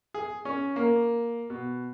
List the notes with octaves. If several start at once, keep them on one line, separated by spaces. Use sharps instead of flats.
G#4
C#4
A#3
B2